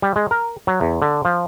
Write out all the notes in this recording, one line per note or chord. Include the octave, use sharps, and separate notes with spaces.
G3
G#3
A#4
F#3
E2
D3
F3